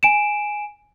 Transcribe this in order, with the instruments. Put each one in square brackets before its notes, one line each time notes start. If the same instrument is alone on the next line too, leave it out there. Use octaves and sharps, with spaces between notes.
[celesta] G#5 D7 E7